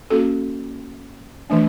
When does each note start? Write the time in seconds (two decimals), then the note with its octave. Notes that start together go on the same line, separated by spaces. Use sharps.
0.10 A#3 C#4 F#4 A4
1.50 E3 A3 D4